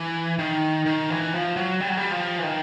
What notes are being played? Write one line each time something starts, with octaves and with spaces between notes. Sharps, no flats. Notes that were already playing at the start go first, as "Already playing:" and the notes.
Already playing: E3
D#3
D#3
E3
F3
F#3
G3
F#3
G3
F3
E3
D#3